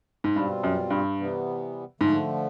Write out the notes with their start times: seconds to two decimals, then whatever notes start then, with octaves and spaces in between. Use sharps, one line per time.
0.24 G#2
0.35 G2 B2 G3 C4 F4
0.64 F#2
0.90 G2
1.18 C3 E3 G3 B3
2.01 G#2 D3 F3 A3